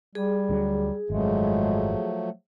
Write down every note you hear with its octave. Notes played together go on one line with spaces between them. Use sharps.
G3 G#4
D2 D3 F#3
G#1 F#2 F3 F#3 G#3 A3